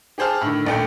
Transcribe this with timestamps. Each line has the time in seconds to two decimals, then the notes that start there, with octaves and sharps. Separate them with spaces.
0.18 G4 G#4 C5 A5 F6
0.41 A2 D3 D#3
0.65 D#1 A#1 A3 G5